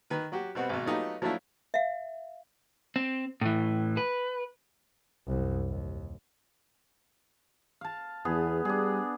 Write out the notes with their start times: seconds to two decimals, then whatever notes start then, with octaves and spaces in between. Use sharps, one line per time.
0.10 D#3 B4
0.32 F#3 F#4 G4
0.55 B2 G3 B3 C4 F#4
0.69 G#1 B2
0.86 F#3 A3 B3 D#4 F4 G4
1.22 F3 F#3 A3 D4 E4 F4
1.74 E5 F5
2.96 C4
3.41 A2 E3
3.97 B4
5.28 C2 F#2
5.68 D#2
7.81 F5 A5
8.25 E2 B3 G#4
8.65 G3 D4 G#4